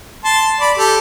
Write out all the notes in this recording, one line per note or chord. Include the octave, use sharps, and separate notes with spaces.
A5 C6
D5 B5
G4 A4